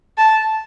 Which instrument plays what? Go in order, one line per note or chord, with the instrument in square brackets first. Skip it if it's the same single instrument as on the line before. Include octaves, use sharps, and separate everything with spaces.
[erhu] A5